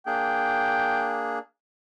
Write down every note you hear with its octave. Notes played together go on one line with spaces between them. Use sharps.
A#3 D4 G#4 G5